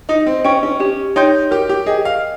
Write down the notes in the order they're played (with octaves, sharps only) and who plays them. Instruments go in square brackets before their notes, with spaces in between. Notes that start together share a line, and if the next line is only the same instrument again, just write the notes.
[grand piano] D#4 [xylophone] D#5
[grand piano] C4
[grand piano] C#4 [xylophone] G5 C#6
[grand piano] C#4
[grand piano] C#4 [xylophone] G4
[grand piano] D#4 [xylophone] C#5 G5 C6 G6
[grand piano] G4 [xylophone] A#4
[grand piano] G4
[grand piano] G#4 [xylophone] D#5 G5
[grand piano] F5